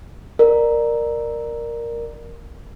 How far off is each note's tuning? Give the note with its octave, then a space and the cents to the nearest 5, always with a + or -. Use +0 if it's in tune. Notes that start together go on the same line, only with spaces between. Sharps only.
A#4 +0 D5 +20